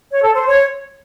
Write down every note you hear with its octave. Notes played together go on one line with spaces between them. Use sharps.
C#5
A4
C5
C#5